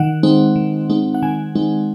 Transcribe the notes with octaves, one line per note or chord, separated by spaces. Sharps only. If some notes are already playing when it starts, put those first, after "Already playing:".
Already playing: D#3 F#5
G#3 C4 D#4
D#3
G#3 C4 D#4
F#5
D#3 G#5
G#3 C4 D#4